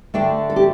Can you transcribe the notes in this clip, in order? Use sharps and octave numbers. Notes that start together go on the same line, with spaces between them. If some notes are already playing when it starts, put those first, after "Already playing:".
D3 A3 D4 G5
A4
G4